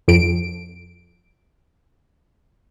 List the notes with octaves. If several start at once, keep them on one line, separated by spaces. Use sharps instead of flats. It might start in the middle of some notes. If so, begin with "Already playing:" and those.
F2 D7